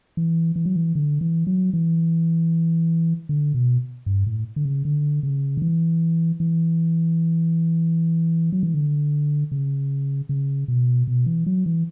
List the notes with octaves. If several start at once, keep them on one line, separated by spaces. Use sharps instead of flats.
E3
E3
F#3
E3
D3
E3
F#3
E3
D3
B2
G2
A2
D3
C#3
D3
C#3
D3
E3
E3
F#3
E3
D3
C#3
C#3
B2
B2
E3
F#3
E3